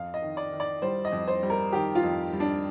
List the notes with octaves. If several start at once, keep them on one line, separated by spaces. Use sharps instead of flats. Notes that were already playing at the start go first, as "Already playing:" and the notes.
Already playing: F2 F5
D#5
D#3
D5
D#3
D5
G3 C5
D#5
F2
C5
G3
A#4
D#3 G4
F4
F2
G3
D4